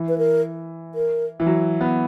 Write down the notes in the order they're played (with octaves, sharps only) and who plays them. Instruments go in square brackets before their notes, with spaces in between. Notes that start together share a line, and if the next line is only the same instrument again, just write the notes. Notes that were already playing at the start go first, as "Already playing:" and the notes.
Already playing: [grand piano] E3
[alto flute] B4
A#4
A#4
[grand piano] E3
F#3
B3